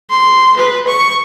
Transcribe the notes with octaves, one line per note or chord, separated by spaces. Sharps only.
C6
B4
C#6